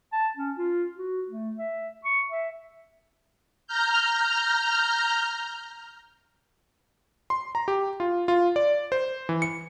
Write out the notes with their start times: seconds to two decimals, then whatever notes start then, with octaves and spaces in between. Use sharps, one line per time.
0.13 A5
0.37 C#4
0.58 F4
0.97 F#4
1.28 A3
1.57 E5
2.05 C#6
2.31 E5
3.67 A#5 F6 G6
7.30 C6
7.55 A#5
7.68 G4
8.00 F4
8.28 F4
8.56 D5
8.92 C5
9.29 E3
9.42 C#7